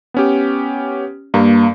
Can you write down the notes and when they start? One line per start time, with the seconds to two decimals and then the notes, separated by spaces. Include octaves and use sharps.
0.14 B3 C#4 G4
1.34 G2 A#3